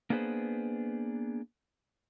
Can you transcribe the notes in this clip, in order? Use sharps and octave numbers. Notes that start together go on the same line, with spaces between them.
A#3 B3 D4 G#4 B4 C5